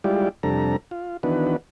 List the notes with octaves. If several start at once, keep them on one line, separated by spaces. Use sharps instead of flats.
G3 G#3 E4 F4 G4 D5
F2 C3 G3 D4 A4 A#5
F4
D#3 E3 B3 D4 F#4 B4